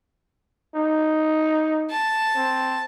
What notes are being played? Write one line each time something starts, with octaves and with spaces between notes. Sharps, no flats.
D#4
A5
C4